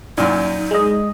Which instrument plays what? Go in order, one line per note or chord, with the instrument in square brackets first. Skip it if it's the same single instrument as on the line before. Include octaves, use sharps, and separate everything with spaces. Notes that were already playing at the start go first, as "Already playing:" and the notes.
[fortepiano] F#2 A#2 [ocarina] D#4
[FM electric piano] G#3 D#5